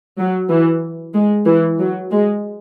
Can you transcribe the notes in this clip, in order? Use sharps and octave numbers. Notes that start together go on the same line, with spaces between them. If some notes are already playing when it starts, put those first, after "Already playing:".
F#3
E3
G#3
E3
F#3
G#3